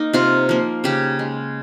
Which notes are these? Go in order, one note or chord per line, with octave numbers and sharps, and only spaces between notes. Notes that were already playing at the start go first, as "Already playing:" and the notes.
Already playing: A#3 D#4
C3 F4
F3 A#3
C#3 G4
G#3